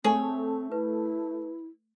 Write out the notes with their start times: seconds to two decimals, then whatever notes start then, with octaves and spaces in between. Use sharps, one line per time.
0.04 A3 C4 G#4 C#5
0.72 E4 B4